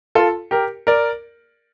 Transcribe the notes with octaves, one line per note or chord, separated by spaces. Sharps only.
F4 A4
G4 A#4
A#4 D5